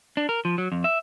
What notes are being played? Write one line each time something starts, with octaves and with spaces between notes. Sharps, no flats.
D4
A#4
F3
F#3
F2
E5